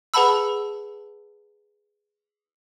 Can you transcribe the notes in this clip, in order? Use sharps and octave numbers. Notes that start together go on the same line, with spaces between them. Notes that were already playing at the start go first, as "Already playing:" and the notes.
G#4 B4 F#5 A5 B5 E6